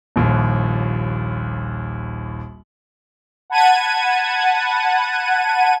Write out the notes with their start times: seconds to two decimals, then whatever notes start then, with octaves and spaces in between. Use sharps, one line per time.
0.16 D#1 A#1 D#2
3.50 F#5 A5 B5 G#6 D#7